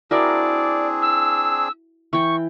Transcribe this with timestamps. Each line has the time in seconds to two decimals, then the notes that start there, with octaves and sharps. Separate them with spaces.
0.11 C4 D4 E4 F#4 G#4 A#4 D5
1.02 E6
2.13 E3 G5 C#6